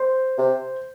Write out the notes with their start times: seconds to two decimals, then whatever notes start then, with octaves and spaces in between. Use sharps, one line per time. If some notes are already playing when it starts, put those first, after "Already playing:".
Already playing: C5
0.38 C3